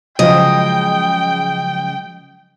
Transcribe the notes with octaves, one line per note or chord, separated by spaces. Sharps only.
C#3 F3 F#3 G#3 D#5 G5